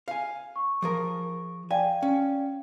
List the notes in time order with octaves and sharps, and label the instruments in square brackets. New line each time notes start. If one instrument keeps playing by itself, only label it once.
[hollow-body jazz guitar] F5 G#5
[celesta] C#6
[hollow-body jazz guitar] F3 G#4 A#4
[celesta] D5 F5 G5 [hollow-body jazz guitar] G#5
[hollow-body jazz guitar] C#4